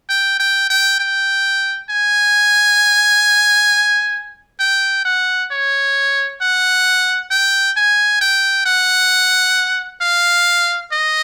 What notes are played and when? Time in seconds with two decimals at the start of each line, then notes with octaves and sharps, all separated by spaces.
0.09 G5
0.40 G5
0.70 G5
1.00 G5
1.89 G#5
4.60 G5
5.05 F#5
5.51 C#5
6.41 F#5
7.31 G5
7.77 G#5
8.21 G5
8.66 F#5
10.01 F5
10.92 D#5